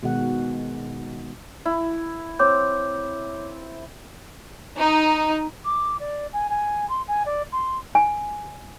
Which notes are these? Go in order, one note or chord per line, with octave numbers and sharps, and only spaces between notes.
B2 D#3 G#3 F#4 F#5
E4
C4 C#5 D6 G6
D#4
D6
D5
G#5
G#5
C6
G#5
D5
C6
G#5